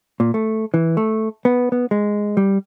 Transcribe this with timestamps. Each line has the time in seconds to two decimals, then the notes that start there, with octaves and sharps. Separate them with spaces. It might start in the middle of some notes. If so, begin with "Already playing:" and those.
0.20 A#2
0.34 A3
0.74 E3
0.97 A3
1.45 B3
1.72 B3
1.91 G#3
2.37 G3